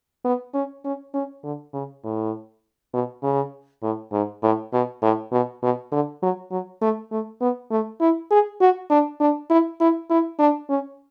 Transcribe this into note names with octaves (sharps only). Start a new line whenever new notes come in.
B3
C#4
C#4
C#4
D3
C#3
A2
B2
C#3
A2
G#2
A2
B2
A2
B2
B2
D3
F#3
F#3
A3
A3
B3
A3
E4
G#4
F#4
D4
D4
E4
E4
E4
D4
C#4